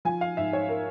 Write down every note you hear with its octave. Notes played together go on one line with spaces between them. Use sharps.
F3 G#5
F5
G#2 E5
C#5
A#4